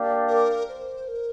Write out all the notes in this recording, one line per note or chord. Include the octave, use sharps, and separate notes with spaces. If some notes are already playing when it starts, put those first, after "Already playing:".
Already playing: A#3 D4 G4 D5 F5
A#4
C5
A#4